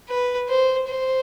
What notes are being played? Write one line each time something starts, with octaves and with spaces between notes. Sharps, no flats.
B4
C5
C5